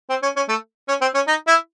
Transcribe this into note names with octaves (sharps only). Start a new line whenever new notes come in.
C4
C#4
C#4
A3
C#4
C4
C#4
D#4
E4